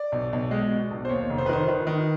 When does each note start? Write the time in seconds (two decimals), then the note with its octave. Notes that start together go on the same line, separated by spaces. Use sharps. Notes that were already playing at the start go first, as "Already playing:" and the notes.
Already playing: D5
0.12 B1
0.33 B1
0.51 G#3
0.71 B2
0.91 B1
1.05 C5
1.09 D#2 C#5
1.30 F1
1.38 C5
1.46 B4
1.49 D#3 C5
1.68 D#3 B4
1.87 D#3